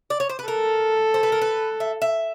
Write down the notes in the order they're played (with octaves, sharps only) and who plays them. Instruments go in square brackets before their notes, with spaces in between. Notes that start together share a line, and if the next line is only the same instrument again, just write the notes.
[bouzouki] D5
C#5
C5
B4
[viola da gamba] A4 [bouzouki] A#4
[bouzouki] C5
B4
A#4
B4
E5
E5